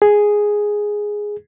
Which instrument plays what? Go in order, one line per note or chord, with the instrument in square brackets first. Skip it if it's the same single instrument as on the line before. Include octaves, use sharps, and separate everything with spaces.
[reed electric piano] G#4